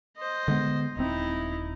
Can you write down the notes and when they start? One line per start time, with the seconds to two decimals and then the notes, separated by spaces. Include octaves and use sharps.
0.17 C5 D#5
0.48 D3 G#3 B3
0.97 D#1 C4 D#4 E4